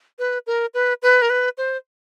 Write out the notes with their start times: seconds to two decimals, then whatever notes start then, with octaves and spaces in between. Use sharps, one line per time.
0.19 B4
0.47 A#4
0.74 B4
1.02 B4
1.22 A#4
1.30 B4
1.58 C5